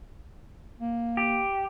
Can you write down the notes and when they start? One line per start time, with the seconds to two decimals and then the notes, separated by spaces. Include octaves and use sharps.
0.80 A#3
1.17 G4